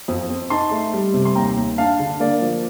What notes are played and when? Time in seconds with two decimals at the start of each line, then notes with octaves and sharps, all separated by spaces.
0.08 F2
0.30 C4
0.50 D#4 A5 C6
0.71 A3
0.93 G3
1.14 C3
1.25 C6
1.35 D#2 G5 A#5
1.57 D#2
1.78 D4 F5 A5
1.99 D3
2.20 A#3 D5 F5
2.41 F3